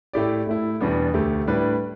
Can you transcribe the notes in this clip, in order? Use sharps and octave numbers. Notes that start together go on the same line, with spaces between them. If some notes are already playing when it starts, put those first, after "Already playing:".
A2 A3 E4 G4 D5
A2 A3 E4
E2 B2 G3 B3 D4
D2 D3 A3 G4
A2 G3 D4 B4